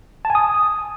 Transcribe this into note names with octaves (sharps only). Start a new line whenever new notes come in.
A5
G#5
D#6